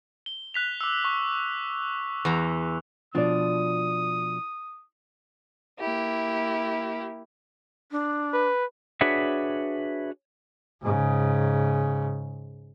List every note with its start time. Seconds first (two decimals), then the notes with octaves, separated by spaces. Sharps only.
0.26 G7
0.54 F#6 B6 F7
0.81 D6 E6
1.04 C#6
2.25 E2 A#5
3.15 B2 F3 D4 F4 D5 D#6
5.80 A#3 E4 G4
7.92 D4
8.34 B4
9.01 D4 F#4 G#4 B4 C#5 E5
10.82 G#2 C#3